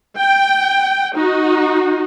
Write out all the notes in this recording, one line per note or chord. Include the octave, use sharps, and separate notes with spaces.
G5
D#4 F#4